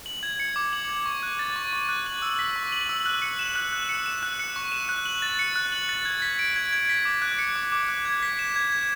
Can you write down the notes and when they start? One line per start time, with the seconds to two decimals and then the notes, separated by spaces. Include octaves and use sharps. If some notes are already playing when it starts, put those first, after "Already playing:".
0.06 F#7
0.23 G#6
0.40 C#7
0.56 D6
0.73 F#7
0.89 G#6
1.06 C#6
1.23 F#6
1.39 A6
1.56 C#6
1.73 C#6
1.89 F#6
2.06 F#7
2.22 E6
2.39 B6
2.56 C#6
2.72 F#7
2.89 E6
3.06 F#6
3.22 C#7
3.39 E7
3.56 F#6
3.73 F#6
3.89 C#7
4.06 E7
4.23 F#6
4.39 C#7
4.56 C#6
4.72 E7
4.89 F#6
5.05 F#7
5.22 A6
5.39 C#7
5.56 F#6
5.72 F#7
5.89 A6
6.05 G#6
6.22 B6
6.39 D7
6.56 G#6
6.73 G#6
6.89 B6
7.05 D6
7.22 F#6
7.39 C#7
7.56 D6
7.72 D6
7.88 F#6
8.05 G#6
8.23 B6
8.39 E7
8.56 G#6
8.72 G#6